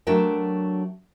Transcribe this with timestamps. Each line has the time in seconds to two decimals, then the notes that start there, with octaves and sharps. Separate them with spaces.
0.07 F#3 A3 D4 F#4 A#4 G5